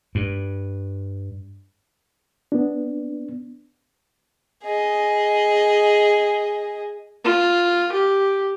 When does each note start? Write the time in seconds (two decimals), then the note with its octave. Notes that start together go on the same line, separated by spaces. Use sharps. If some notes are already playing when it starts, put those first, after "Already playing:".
0.15 G2
2.52 B3 D4
4.64 G#4 D#5
7.25 F4
7.93 G4